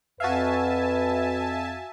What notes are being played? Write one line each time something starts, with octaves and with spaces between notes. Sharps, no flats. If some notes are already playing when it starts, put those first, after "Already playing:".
F2 F#4 B4 E5 F5 G#5 A5